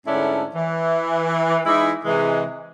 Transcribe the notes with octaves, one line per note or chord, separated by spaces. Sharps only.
G#2 D3 A3 C#4 D4 E4
E3
E3 G#3 D#4 E4
C3 E3 G#3